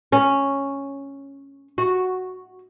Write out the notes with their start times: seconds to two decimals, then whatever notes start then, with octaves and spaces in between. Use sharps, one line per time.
0.12 C#4
1.78 F#4